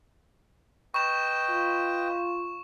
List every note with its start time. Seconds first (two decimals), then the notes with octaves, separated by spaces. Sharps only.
0.94 B4 D#5 G5 C#6 E7
1.50 F4